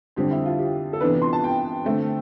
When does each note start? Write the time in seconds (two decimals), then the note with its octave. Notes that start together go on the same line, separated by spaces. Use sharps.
0.16 F2 D3 G3 C4 G4
0.31 E4
0.46 F4
0.59 G4
0.93 A4
1.01 C3 E3 B3 D4 B4
1.22 C6
1.33 A5
1.44 G5
1.85 D3 A3 C4